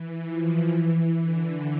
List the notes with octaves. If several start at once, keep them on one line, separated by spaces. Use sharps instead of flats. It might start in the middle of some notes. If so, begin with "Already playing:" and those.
Already playing: E3
F3
E3
D3